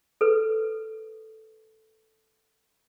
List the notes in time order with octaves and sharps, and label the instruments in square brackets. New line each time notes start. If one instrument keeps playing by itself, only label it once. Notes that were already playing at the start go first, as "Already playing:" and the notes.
[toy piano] A4 B4